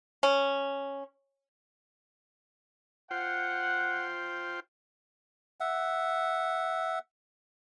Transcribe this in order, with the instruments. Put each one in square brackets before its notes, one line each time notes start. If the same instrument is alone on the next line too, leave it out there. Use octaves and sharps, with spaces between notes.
[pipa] C#4
[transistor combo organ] F4 C5 G5 [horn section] F#5
[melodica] E5 F#5